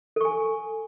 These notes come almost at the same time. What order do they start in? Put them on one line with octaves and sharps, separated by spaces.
A4 C#6 G#5